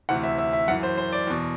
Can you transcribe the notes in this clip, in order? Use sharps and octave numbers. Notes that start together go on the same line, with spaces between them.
D2 C3 E3 F#5
E5
E5
E5
F#2 E3 F#5
C5
C5
D5
E2 B2